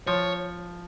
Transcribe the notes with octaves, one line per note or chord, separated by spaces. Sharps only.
F3 C#5